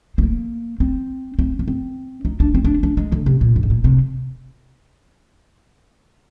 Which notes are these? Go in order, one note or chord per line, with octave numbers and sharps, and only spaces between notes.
C4
A#3
C4
C4
A#3
C4
D#4
D4
C4
D4
D4
G#3
D3
C3
A#2
G2
G#2
A#2
C3